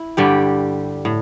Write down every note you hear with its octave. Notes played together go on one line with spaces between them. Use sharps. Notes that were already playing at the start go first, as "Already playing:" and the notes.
Already playing: E4
G2 D3 G3 G4
A2